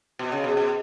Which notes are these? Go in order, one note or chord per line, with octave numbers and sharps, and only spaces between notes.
B2
C#3
B2
B2